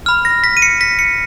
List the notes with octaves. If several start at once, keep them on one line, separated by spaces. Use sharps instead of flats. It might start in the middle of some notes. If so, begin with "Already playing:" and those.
B5 F6
A#6
B6
D#7
C#7
B6
C#7